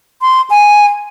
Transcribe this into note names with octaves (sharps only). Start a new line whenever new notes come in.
C6
G#5